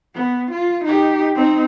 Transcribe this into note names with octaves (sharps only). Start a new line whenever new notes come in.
B3
F4
D#4 G4
C4 D#4